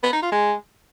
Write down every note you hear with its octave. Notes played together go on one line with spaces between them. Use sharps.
B3
D#4
F4
G#3